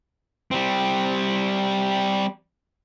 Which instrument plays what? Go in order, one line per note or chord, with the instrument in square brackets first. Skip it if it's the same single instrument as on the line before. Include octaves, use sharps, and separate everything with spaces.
[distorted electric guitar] G3 C4